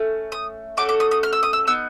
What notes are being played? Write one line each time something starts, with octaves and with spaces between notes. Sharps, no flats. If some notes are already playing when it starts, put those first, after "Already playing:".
Already playing: A3 C#4
D#6
A3 C#4 F#4 A4 D6
D6
D#6
D#6
F6
E6
D#6
E6
B3 D#4 E6